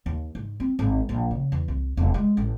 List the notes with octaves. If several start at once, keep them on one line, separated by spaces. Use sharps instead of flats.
D#2
G#2
C4
G#1
A#1
C#3
E2
C2
E1
G#3
A1